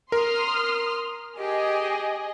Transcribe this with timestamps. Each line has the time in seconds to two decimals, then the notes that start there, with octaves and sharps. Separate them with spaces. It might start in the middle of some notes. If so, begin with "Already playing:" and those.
0.12 A#4 C6 D#6 F6
1.38 G4 G#4 D#5